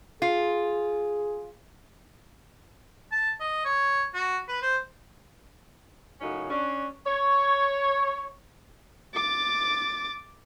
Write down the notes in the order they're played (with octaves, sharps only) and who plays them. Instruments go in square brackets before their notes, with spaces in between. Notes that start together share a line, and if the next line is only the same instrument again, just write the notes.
[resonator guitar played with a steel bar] F4 [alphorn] G#4
[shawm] A5
D#5
C#5
F#4
B4
C5
[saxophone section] F#2 A2 C#3 C#4 D#4 F#4
C#4 D4
C#5
[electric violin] D6 A6